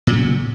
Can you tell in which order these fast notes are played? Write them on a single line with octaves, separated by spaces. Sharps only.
A#2 F#3 C#3